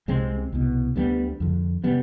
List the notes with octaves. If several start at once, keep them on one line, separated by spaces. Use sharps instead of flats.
C2 C3 G#3 C4
C2 B2
D2 D3 G3 B3
F2 D3
C3 G3 B3